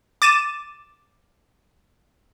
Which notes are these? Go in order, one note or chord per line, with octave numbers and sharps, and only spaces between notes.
D6 A6 D#7 E7